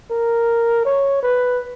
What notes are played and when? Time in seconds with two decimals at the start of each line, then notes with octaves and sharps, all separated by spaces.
0.11 A#4
0.85 C#5
1.22 B4